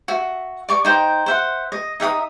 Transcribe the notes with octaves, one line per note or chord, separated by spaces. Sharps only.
F#4 E5
D5 C#6 D6
D#4 C5 G5
C5 E5 F#5
D#5
D#4 E5 F#5 D#6